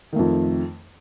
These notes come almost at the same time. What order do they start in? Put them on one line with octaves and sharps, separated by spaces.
D#3 A3 F2